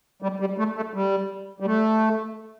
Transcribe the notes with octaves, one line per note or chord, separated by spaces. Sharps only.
G3
G3
A3
A3
G3
G3
A3